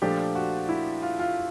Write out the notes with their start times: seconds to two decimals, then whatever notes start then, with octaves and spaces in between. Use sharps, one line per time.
0.02 A#2 F3 A3 D4 G4
0.35 F#4
0.69 E4
1.02 F4
1.19 F4